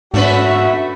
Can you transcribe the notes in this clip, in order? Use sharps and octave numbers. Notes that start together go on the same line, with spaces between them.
G#2 A3 C#4 D4 F#4 B4 E5